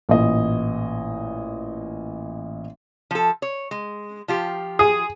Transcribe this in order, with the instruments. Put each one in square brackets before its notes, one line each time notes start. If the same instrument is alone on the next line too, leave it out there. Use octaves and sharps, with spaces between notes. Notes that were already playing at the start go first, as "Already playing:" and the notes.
[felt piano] A1 A#2 D#5
[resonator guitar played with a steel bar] F3 A4
C#5
G#3
F3 F4 G4
[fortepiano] G#4